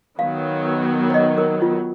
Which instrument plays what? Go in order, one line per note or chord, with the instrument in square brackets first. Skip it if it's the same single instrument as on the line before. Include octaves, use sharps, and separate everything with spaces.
[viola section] D#3 F#3 B3 [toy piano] F5
[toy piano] C#5
D#5
A#4
F4